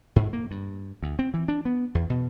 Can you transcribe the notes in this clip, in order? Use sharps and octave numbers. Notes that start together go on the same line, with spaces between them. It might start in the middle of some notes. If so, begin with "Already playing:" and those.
G#2
A#3
G2
D2
C4
E3
D4
B3
E2
B2